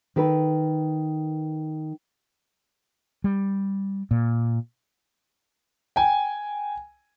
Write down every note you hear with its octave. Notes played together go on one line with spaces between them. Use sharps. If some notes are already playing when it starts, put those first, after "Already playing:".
D#3 A4 B4
G3
A#2
G5 G#5